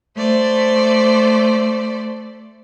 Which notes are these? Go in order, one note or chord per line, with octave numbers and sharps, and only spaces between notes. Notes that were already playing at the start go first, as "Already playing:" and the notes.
A3 C5 D5